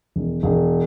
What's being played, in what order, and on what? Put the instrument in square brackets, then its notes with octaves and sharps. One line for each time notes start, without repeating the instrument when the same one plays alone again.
[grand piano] E1
E1